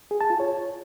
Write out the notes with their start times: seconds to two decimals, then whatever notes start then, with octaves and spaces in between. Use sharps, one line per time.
0.11 G#4
0.21 A5
0.30 F4
0.40 C#5